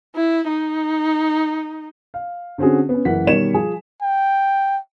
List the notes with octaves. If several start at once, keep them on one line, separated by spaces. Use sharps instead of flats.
E4
D#4
F5
D3 C4 C#4 F#4 G#4
B3 C#4
F#1 E3 A#4 F#5 B6
B2 D#3 G3 C#5 E7
F3 G#4 G#5
G5